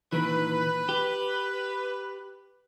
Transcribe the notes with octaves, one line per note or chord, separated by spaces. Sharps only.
A#2 D#3 E3 B4
G4